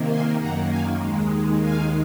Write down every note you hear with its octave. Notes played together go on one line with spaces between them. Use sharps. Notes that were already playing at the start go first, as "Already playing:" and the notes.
Already playing: C3 D#3 A#3
G#5 C6
F#2 D#3 A#3 F#5 A#5
F5 G#5
D#2 D#3 G#3
D#2 D#3 G#3 F5 G#5